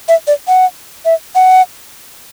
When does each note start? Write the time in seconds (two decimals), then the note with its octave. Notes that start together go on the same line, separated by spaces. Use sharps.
0.08 E5
0.27 D5
0.48 F#5
1.05 E5
1.35 F#5